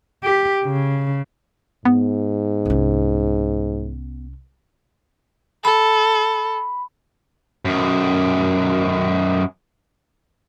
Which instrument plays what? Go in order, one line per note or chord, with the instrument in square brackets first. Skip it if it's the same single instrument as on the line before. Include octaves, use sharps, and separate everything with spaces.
[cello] G4
C#3
[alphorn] G#2 [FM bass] B3
[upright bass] C2 C#4
[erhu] A4 [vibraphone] B5
[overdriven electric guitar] F#2 D#3